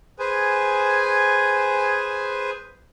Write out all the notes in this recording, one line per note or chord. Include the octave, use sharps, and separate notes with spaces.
G#4 B4 C5 G#5